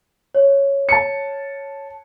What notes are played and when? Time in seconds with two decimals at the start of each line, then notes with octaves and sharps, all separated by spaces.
0.35 C#5
0.89 A5 C#7